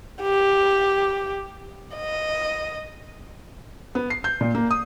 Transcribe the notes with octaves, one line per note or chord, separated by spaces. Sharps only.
G4
D#5
B3
C7
G6
A#2
A#3
D#6